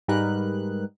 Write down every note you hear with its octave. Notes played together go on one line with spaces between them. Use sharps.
G#2 G3 D#4 A#4 B4 F#6